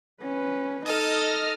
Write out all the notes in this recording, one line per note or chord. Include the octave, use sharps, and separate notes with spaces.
C#4 B4
D#4 A4 D#5 D#6 F6